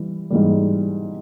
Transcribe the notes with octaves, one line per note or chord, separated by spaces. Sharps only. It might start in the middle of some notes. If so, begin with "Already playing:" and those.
Already playing: E3 G3
G#2 E3 G3